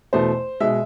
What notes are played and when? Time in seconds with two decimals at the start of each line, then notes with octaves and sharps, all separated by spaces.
0.13 E2 B2 A3 C5
0.60 B2 G#3 E5